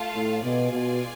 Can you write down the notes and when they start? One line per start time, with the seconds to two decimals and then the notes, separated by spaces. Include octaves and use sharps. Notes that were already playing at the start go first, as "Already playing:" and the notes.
Already playing: A3 F4 A4 F5 A5
0.15 A2
0.43 B2 F4 G#4 D5 G#5
0.71 B2